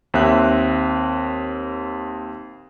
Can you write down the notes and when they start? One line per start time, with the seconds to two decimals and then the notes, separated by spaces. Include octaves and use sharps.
0.14 D#2 C4 E5 F#6